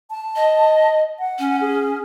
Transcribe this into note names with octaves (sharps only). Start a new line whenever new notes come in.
A5
D#5
F#5
C#4
G#4